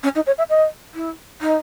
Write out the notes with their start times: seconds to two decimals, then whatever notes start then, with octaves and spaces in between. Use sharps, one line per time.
0.03 C#4
0.15 D#4
0.27 C#5
0.38 E5
0.49 D#5
0.94 E4
1.41 D#4